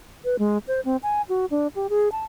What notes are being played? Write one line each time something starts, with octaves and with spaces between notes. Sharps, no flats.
B4
G#3
C5
C4
G#5
F#4
D4
G4
G#4
A5